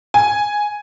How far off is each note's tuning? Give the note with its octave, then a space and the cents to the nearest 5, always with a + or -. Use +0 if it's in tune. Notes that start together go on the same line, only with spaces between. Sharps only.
G#5 +0